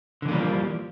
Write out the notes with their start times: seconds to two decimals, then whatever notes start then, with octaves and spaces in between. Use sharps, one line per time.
0.22 D3
0.25 E3
0.28 A#3
0.31 G3
0.34 F3